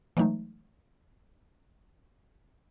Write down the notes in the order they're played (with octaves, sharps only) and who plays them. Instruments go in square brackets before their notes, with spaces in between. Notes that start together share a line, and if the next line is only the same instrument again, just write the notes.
[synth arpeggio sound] E3 F#3 G#3 A3 D#4